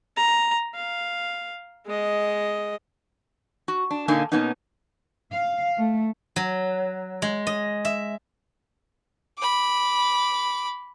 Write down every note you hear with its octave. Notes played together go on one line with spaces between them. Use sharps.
A#5
F5
G#3 D#5
F#4
D4
A#2 D3 A#3 D#4 G#5
B2 A#3 B3 C#4 D#4
F5
A3
F#3
G#3
D#5
E5
B5 D6